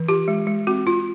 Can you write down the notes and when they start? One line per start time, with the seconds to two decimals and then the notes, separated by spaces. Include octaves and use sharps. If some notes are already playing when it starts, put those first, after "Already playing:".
Already playing: E3
0.09 F4 G4
0.28 G#3
0.47 G#3
0.67 C4 F#4
0.87 F4